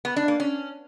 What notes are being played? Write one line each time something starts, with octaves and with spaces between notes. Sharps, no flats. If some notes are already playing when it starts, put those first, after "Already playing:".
B3
D4
A#3
C#4